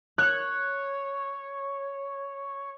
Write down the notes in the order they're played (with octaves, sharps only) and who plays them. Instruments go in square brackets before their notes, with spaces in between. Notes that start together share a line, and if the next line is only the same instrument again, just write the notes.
[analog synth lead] C#5 [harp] F#6